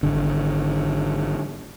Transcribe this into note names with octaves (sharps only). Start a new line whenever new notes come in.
G#1 D3